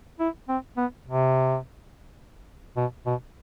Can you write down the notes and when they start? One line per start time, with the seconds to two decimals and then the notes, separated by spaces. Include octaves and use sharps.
0.20 E4
0.49 C4
0.77 B3
1.06 C3
2.77 B2
3.06 B2